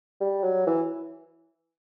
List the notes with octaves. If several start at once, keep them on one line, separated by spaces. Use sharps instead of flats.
G3
F#3
E3